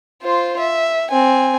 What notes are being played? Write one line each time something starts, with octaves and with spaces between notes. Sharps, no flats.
F4 C5
E5
C4 G#5